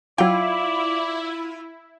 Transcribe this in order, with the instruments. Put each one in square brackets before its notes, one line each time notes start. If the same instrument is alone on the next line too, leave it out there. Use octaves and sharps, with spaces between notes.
[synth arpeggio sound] F#3 G5 [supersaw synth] E4 [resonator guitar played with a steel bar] F4 [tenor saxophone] D5